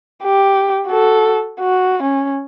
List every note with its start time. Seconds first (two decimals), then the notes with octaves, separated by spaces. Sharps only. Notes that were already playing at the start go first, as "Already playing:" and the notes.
0.24 G4
0.87 F#4 A4
1.60 F#4
2.03 C#4